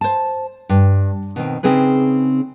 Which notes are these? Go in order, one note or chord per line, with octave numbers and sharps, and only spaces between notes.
C5 A5
G2
B2 D#3 C4
C#3 C4 D#4 G#4 B4